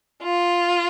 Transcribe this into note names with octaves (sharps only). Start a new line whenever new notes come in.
F4